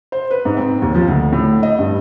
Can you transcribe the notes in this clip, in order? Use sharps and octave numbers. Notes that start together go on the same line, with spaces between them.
C5
B4
G#2
C4
D#2
F3
D2
A2
D#5
G2